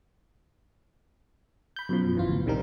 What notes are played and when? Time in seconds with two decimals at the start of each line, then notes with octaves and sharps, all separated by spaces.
1.76 B5 G6
1.89 F#2 B2 F3
2.15 G#1 E3 F4
2.28 D2
2.45 A#1 C3 D#3 G3 C4 A#4